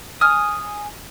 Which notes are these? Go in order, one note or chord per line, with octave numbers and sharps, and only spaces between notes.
G#5 D#6 F6